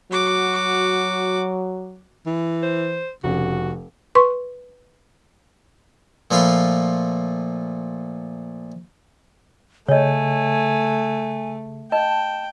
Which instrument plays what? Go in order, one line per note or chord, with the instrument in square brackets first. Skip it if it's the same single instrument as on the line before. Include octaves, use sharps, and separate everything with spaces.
[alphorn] F#3 [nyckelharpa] F#4 D6
[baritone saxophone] E3
[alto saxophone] C5
[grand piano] F1 [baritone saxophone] C#3 [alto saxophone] F#4
[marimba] B4 C6 C#6
[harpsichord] A#2 F3 A3 F5 B5 C6
[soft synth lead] C#3 [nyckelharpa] A3 [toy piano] C#5 D#5 [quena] G#5
[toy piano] D#5 [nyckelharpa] G5 [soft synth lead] A5